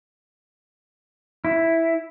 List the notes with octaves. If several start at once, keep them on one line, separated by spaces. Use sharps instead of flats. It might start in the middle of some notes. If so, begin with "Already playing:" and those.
E4